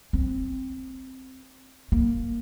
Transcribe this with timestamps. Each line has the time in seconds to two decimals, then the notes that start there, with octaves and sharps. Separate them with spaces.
0.13 C4
1.92 A#3